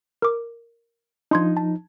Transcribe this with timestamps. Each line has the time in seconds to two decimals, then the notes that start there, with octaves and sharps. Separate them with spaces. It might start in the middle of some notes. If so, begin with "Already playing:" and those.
0.22 A#4 D6
1.31 F3 D4 D#4 C6 G#6
1.57 A5